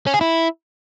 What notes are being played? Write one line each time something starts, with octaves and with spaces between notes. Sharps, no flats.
C#4
G#4
E4